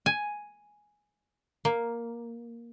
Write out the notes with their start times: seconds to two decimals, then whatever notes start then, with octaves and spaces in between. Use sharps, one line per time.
0.06 G#5
1.65 A#3